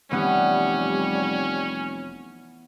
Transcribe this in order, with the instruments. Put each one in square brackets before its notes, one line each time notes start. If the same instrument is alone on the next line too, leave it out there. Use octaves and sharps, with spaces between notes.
[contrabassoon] F1 [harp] E3 B3 [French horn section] G3 [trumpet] C#4